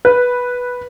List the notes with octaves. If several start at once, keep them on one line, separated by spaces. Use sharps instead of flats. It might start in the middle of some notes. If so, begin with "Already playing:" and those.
B4